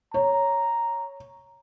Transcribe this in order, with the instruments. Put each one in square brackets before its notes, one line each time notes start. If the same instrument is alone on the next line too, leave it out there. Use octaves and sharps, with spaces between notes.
[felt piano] C#5 [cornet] A#5